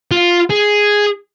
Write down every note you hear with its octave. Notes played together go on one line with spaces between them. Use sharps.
F4
G#4